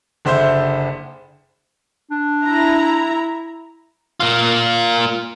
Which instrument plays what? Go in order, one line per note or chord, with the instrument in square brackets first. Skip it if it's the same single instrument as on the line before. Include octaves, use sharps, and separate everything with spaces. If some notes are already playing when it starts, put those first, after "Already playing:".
[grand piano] F#1 D3 C5 E5 C6 G6
[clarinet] D4
[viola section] E4 A#5
[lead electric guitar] A#3 F4